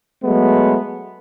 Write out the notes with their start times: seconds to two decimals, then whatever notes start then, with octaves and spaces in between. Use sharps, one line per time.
0.24 F#3 G#3 A3 B3